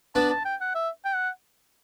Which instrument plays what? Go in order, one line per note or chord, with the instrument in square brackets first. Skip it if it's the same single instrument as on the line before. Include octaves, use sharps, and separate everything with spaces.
[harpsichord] B3 D4 [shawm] A5
[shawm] A5
G5
F#5
E5
G5
F#5